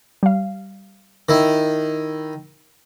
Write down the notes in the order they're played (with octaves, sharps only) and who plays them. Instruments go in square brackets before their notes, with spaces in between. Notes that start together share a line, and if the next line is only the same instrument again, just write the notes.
[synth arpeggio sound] G3 F5
[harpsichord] D#3 E4